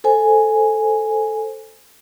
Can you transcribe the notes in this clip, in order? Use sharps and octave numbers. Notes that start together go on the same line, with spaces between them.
A4 C5 G#5